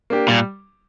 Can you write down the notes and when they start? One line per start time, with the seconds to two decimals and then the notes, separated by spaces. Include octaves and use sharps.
0.10 A#3 D4 G4
0.27 A#2 G3